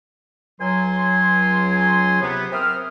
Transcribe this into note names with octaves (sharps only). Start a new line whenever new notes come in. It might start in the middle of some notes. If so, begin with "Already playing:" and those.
C#2 F#3 G#5 C6
C3 B3
C4 A#4 E5 D#6 F6